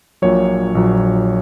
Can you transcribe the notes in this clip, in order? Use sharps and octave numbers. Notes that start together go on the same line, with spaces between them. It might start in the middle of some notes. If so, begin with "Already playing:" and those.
A#1 A#2 F#3 C#5
A#1 A#2 F#3